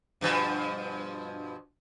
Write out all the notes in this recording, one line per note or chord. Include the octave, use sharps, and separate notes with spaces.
G2 B2 F3